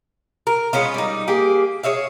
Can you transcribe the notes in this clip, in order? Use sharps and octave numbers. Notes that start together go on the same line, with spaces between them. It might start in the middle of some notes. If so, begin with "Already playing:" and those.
A#4
G#3 B3 C#4 F4
G3 D#4
A#3 G4 G#4
G#4 C#5 E5 F5